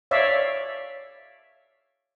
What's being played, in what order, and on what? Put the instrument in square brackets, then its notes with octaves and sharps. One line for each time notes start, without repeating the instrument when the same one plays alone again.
[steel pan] C#5 D5 E5 F5